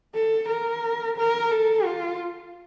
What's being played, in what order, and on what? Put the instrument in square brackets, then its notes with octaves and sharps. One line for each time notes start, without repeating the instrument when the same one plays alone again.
[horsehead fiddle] A4
A#4
A#4
A4
F4